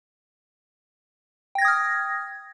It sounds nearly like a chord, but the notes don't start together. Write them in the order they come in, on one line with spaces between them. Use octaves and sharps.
G5 A#6 G#6 D#6 F6